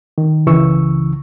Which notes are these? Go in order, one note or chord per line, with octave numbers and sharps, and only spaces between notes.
D#3
C#2 C#3 E3 C#6 E6